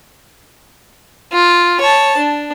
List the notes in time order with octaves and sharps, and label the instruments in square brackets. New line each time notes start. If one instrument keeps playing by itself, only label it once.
[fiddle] F4
C#5 A5
D4